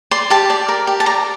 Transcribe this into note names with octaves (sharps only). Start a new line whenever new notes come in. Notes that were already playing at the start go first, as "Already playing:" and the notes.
D5 C6
G4 A5
D5
A#4
G4
A5
D5 A#5